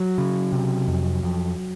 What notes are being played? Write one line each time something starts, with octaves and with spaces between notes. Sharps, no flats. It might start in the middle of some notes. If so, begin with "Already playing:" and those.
Already playing: F#3
C#3
C3
F2
F2